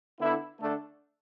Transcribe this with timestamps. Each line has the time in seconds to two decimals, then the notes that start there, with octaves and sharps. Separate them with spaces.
0.18 D3 B3 E4
0.60 D3 A3 D4 A4